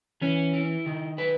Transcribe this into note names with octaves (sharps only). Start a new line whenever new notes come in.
E3 C#4
E4
D#3
B4